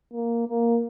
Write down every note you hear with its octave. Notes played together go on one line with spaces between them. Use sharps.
A#3
A#3